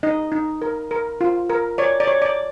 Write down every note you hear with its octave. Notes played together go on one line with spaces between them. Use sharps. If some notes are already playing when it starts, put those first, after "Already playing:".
D#4 D#5
D#4
A#4
A#4
F4
A#4
C#5 D5
D5
C#5
D5